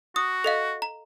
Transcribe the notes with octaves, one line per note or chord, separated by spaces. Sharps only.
F#4 D#6
A4 D#5 F5
A#5